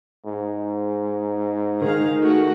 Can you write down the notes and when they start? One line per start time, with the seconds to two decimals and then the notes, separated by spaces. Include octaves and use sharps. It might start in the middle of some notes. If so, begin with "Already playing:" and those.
0.25 G#2
1.82 D#3 G#4 F5
2.20 A3 F#4